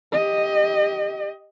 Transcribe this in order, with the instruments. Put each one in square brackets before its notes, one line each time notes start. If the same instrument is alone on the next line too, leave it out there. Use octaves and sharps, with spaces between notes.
[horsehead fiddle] G4 D#5